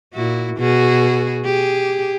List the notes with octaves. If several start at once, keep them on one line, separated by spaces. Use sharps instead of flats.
A#2 E4 F#4
B2 F#4 G#4
G4 G#4